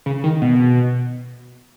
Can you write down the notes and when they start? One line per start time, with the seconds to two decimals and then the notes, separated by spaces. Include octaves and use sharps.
0.06 C#3
0.24 D#3
0.42 B2